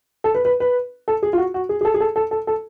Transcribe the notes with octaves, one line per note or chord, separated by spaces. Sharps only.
A4
B4
B4
B4
A4
G#4
F4
F#4
F#4
G#4
G#4
A4
G#4
A4
A4
A4
A4